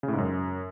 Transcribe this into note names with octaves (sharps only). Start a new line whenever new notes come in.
C#3
A2
G#2
F#2